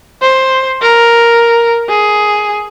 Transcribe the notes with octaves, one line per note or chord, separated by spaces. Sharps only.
C5
A#4
G#4